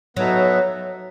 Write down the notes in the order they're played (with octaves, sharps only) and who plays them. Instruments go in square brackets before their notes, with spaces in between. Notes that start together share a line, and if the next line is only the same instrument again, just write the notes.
[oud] F#3 [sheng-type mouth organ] B3 D#4 F#4 A4 E5